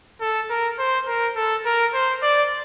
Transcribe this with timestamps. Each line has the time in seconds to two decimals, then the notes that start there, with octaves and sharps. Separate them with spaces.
0.21 A4
0.50 A#4
0.79 C5
1.08 A#4
1.36 A4
1.65 A#4
1.94 C5
2.22 D5